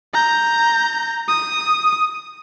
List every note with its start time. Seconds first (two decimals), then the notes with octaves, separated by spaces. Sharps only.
0.14 A#5 G6
1.28 D#6